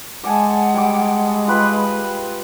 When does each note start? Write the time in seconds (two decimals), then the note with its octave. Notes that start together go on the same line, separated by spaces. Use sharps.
0.24 G#3 D5 F#5 G#5 A5
0.74 G3 D6
1.48 F4 G4 B4 B5